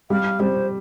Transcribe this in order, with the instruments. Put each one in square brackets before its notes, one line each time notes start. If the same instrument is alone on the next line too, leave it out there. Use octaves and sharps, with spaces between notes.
[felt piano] G3 [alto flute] F5
[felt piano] G3 [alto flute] C5